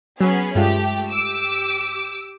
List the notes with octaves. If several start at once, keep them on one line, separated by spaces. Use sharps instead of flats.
F#3 B3 C#4 G#4
G2 G#3 A3 F4 G4
G4 D6 E6